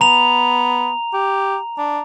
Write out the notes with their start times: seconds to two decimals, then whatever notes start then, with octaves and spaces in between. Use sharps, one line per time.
0.01 B3 A#5 F7
1.13 G4
1.78 D4